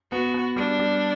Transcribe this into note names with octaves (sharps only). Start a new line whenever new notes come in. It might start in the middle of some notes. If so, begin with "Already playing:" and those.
B3 F#4
B3
G3 D4
G3